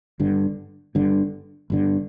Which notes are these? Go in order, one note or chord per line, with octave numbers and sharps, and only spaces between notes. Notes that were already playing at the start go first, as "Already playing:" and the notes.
G1 G2 D3
G1 G2 D3
G1 G2 D3